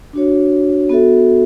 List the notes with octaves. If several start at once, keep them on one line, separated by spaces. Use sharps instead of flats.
D4 F#4 C#5
B3 F#4 A4 E5